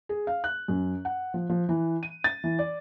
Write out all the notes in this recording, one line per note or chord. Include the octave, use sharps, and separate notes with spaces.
G#4
F5
F#6
F#2
F#5
F3
F3
E3
D#7
A6
E3
D5